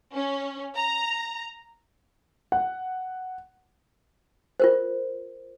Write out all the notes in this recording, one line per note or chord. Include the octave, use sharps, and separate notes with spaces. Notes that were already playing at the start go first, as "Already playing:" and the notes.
C#4
A#5
F#5
F4 A#4 C5